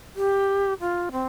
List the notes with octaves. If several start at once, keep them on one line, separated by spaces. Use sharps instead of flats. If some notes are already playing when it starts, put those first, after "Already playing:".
G4
F4
C4